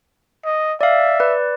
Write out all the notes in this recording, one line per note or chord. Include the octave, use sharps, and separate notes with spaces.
D#5
D5 E5 F5
B4 D5